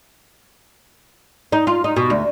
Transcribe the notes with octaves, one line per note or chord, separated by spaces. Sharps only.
D#4
F4
D#4
B2
D2